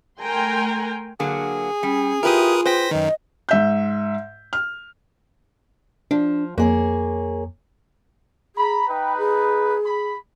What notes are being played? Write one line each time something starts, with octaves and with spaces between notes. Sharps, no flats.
A3 A#4 G5 G#5 A#5 C6
D3 F#3 A#3 G#4
G3 C#4
E4 F4 G4 A#4 B4 D#6
B4 C5 G5 A#6 B6
F#2 D#3 D#5
G#2 E5 G6
F6
F3 D4
F2 A#3 G#4 C#5
G#4 A#5 B5
D#4 B4 G5
G#4
B5